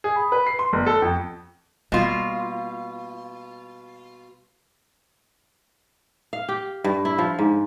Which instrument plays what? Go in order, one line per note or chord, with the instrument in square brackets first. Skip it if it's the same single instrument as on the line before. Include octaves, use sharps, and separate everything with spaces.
[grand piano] G#4
B5
B4
C7
C6
G1
A4
F2
[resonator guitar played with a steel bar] B2 F4 [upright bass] G3 A#3
[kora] F5
G4
G2
E4
F3
G#2